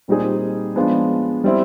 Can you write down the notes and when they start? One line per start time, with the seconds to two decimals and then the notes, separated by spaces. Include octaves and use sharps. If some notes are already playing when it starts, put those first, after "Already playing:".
0.08 A#2 G3 C4 D#4 G#4
0.76 F3 G#3 B3 D4 F4
1.44 G3 C4 E4